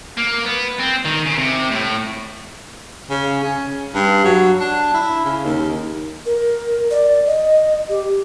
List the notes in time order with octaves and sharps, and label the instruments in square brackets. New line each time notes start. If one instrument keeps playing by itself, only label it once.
[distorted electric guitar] A#3
B3
C4
D#3
C#3
C3
A2
[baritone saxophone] C#3
C#4
G2
F#3
D4
E4
C#3
D#2
[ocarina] A#4
D5
D#5
G4